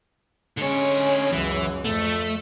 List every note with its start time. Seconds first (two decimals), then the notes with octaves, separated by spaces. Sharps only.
0.58 D3 G#3 C#4 C#5
1.32 C#2 F#2 E3
1.85 F2 A3